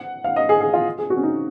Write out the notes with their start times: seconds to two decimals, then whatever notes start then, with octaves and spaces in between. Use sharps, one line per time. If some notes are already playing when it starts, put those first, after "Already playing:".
Already playing: F#5
0.24 F5
0.36 D#5
0.49 G#4
0.61 G#4
0.74 F4
0.98 G#4
1.10 F#4
1.17 C#4
1.23 D#4